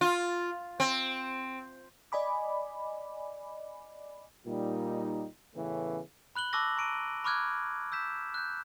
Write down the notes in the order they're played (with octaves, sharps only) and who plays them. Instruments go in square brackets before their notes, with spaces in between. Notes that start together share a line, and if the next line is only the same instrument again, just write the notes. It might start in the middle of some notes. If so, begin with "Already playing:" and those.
[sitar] F4
C4
[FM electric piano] D5 D#5 G#5 B5 D6
[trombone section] A#2 G3 D#4
A2 C#3 E3 A3 B3 C#4
[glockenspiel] B5 F#6 F#7 G7
A5 C#6 D6 E6 F#6 A#6
A#5 C#6 D7 D#7
B5 C#6 D6 F6 F#6 G#6
E6 G6 B6 E7
F#6 G6